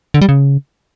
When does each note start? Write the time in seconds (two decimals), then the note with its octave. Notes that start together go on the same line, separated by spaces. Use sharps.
0.14 D3
0.21 G3
0.29 C#3